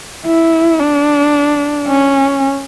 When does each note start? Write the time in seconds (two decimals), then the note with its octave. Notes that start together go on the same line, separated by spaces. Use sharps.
0.26 E4
0.80 D4
1.88 C#4